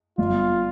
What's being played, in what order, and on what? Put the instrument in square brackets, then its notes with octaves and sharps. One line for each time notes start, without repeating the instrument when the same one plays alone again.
[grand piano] G1 [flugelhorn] F4